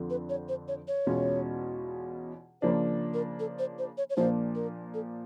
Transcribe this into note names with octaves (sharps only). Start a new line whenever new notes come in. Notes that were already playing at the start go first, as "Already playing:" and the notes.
Already playing: F2 D3 F3 A3 C4
B4
C#5
C5
C#5
C#5
E2 B2 G#3 C#4 F4
C#3 F3 A#3 D4 C5
A#4
A4
C5
C5
C#5
C#5
A#2 F3 A#3 D4 F4 C5
A#4
A4